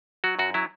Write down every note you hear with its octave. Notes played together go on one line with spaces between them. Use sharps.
F#3 F#4
F#2 F#4
F#3 E4